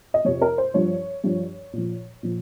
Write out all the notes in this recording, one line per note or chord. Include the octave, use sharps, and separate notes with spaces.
D#5
F2 C3 F3 C#5
A#4
C5
G2 F3 C#5
G2 F3
A#2 F3
A#2 F3